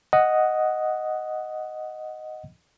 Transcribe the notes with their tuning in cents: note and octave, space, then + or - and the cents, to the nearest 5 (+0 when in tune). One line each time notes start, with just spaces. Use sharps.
D#5 +0 F#5 +0